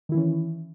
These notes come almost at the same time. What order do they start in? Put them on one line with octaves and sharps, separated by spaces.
D#3 E4 E3 C#4